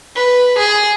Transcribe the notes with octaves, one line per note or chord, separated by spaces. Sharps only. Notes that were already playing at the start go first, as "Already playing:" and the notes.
B4
G#4